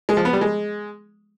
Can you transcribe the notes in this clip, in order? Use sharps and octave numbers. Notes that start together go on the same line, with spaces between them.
G#3
F3
B3
G3
G#3